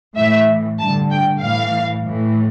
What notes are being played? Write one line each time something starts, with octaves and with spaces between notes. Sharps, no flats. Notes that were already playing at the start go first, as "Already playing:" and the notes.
A2 E3 E5
G2 D3 A5
G5
A2 E3 F5
A2 E3